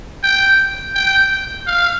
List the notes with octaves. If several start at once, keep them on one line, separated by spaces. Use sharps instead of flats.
G5
G5
F5